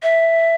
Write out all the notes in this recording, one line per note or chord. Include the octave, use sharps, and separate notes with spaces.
E5